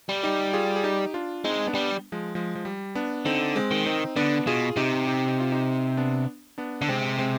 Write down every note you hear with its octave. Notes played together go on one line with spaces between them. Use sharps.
G3
D#4 G4
F4 G#4
G#4
D#4 G4
D4 F4
G#3 C4 D#4
B3 D4
G3
F3 G#3
F3 G#3
F3
G3
B3 D4
D3 C4 D#4
G#3 C4
D#3
C4 D#4
D3 B3 D4
B2 F4 G#4
C3 D#4 G4
D#4 G4
D#4
F4
D#4 G4
B3 D4
B3 D4
D3 D4
C3 G#3 C4
G#3 C4